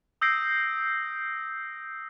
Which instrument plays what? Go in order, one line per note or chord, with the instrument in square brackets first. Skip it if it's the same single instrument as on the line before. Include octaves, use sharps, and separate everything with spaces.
[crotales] D#6 E6 G6 A#6 C7 D7